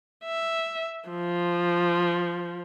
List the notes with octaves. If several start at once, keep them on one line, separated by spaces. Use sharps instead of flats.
E5
F3